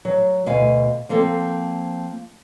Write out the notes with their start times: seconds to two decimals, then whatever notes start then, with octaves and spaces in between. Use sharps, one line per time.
0.05 F#3
0.46 D2 B2 F5 G#5
1.09 F3 A#3 C4 A4